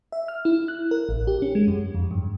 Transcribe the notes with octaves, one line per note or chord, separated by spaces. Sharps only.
E5
F6
E4
F#6
A#4
A1
G4
C#4
G#3
F#2
F2
G2